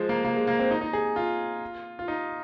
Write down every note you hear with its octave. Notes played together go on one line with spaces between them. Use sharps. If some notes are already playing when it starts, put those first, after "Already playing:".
Already playing: F3 G#3
A#3
A#3
G#3
A#3
C4
D#4
D#4
G#4
F4
F4
D#4